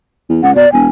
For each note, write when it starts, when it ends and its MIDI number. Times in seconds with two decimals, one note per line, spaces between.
0.29 0.40 40
0.43 0.54 37
0.43 0.54 78
0.55 0.66 47
0.55 0.69 74
0.73 0.88 28
0.73 0.87 80